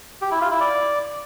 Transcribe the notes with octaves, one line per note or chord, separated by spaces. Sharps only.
G4
E4
F4
E4
D5